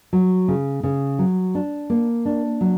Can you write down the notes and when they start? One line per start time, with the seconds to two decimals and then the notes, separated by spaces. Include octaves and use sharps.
0.13 F#3
0.48 C#3
0.83 C#3
1.19 F#3
1.55 D4
1.90 A#3
2.25 D4
2.61 F#3